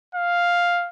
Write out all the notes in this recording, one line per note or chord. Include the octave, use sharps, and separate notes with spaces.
F5